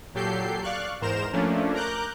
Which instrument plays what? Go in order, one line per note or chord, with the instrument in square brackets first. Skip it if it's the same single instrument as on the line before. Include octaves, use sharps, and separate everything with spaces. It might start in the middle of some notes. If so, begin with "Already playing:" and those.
[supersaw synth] A#2 F#3 G4 A4 G6 C7
D5 F5 C#6 F#6
E2 G#2 A#4 C5 A#5 E7
F3 A3 A#3 C#4 D4
A#4 A#5 D6 F#6 G6